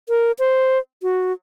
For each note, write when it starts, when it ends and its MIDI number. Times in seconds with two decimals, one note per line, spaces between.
0.09 0.32 70
0.39 0.79 72
1.03 1.32 66